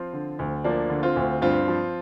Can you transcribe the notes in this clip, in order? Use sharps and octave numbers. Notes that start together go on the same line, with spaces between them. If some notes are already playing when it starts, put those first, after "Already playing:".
Already playing: F3 C4 F4
D3
D2
F3 A#3 D4
D3
C4 F4
D2
G2 C4 F4
F3